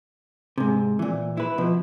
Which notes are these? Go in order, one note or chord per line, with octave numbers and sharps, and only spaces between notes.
G#2 C3
A#2 E3
E4 B4
B2 F3